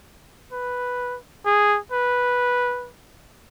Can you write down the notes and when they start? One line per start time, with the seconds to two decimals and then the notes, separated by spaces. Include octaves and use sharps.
0.53 B4
1.46 G#4
1.92 B4